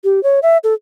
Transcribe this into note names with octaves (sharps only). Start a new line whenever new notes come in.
G4
C#5
E5
A4